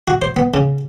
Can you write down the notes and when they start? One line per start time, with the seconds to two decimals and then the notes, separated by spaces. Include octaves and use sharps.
0.08 F#4
0.22 C5
0.36 B3
0.54 C#3